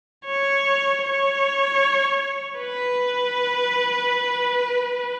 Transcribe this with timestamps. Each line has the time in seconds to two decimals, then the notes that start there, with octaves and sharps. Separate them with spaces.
0.25 C#5
1.03 C#5
2.59 B4